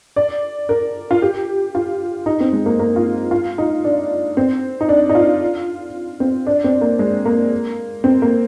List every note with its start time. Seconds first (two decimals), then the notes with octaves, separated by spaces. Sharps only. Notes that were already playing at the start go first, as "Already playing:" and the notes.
0.16 D5
0.69 A#4
1.11 F4
1.22 G4
1.75 F4
2.26 D#4
2.40 C4
2.53 G#3
2.66 A#3
2.79 A#3
2.96 F4
3.31 F4
3.58 D#4
3.84 D4
4.37 C4
4.81 D#4
4.89 D4
5.09 D#4
5.15 F4
6.20 C4
6.47 D4
6.64 C4
6.81 A#3
6.99 G#3
7.25 A#3
8.04 C4
8.22 A#3